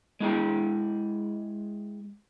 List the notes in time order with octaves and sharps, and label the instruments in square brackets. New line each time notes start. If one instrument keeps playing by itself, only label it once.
[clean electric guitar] G#3 E4 G#4 G5